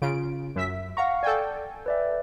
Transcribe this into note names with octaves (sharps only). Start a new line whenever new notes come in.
C#3 F4 D7
F#2 E5 B6
F5 F#5 A#5 C#6
A4 D5 G5 G#5
B4 D5 E5